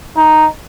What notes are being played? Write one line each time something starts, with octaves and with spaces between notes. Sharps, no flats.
D#4